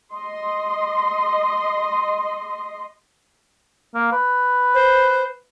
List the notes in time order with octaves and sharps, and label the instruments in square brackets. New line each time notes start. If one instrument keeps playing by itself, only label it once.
[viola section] D#5 C6
[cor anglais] A#3
B4
[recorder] C5